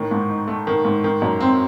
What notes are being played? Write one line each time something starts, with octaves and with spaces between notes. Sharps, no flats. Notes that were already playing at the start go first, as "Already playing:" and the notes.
Already playing: A2 D#3
G#2
D#4
A3
D#3
G#2
D#3
F#2
C4